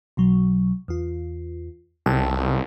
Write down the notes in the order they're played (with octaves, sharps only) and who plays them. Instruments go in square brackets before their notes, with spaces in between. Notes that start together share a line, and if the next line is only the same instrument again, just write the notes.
[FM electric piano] B1 B2 F#3
E2 F4
[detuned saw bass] C2 [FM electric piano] G5 A5 E6